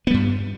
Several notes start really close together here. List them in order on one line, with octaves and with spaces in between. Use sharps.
B3 G3 G2